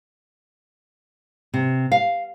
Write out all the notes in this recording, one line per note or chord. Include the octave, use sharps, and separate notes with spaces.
C3
F5